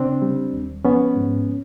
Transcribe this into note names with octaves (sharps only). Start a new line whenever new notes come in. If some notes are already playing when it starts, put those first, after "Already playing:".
Already playing: C#3 C4 D4
G3
D#2
F3 B3 C#4
G#2